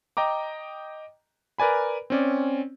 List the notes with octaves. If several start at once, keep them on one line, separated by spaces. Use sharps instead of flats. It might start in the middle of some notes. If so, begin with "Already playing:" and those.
D#5 G5 A#5 D6
A#4 B4 D5 G#5 B5
C4 C#4 D5